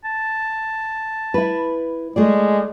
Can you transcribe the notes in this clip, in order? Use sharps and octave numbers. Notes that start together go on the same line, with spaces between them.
A5
E4 B4
G#3 A3 G#4 D5